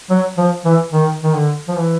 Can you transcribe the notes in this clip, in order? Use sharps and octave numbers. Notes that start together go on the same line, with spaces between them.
F#3
F3
E3
D#3
D#3
D3
F3
E3